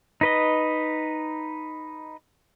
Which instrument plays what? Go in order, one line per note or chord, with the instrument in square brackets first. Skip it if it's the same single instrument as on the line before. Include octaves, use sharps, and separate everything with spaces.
[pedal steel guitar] D#4 B4 D#5